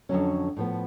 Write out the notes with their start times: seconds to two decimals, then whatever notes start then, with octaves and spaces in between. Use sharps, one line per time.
0.09 F2 D3 F#3 C#4
0.56 A2 F3 B3